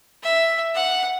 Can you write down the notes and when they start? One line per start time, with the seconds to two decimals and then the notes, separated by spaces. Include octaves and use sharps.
0.23 E5
0.75 F#5